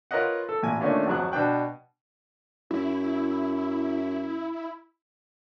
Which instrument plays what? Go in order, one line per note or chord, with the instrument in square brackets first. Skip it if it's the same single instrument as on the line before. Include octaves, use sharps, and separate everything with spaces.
[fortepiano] F4 A#4 B4 C#5 D#5 F#5
A4
A1 A#2 G#5
D#3 A3 A#3 C#4 D4 F4
G#1 F2 F#3 F#6
B2 B3 D4 G5 F#6
[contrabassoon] F#2 [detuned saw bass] E4